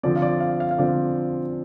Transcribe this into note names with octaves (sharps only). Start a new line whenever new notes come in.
D3 F3 C4 D5
F5
D5
F5
F5
F5
D3 F3 C4 D5